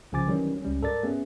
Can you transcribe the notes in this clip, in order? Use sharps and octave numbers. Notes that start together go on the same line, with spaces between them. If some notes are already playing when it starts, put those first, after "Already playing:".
C2 C#3 F3 G#5 D6 A6
D#3 E3 F#3 G3 C#4
C#2 G3 C#4
G#2 A4 A#4 D5 A6
A3 B3 C#4 G#4